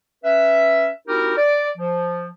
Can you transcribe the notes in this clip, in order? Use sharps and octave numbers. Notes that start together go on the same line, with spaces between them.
C#4 B4 E5
C4 D#4 E4 F#4 G4 A#4
D5
F3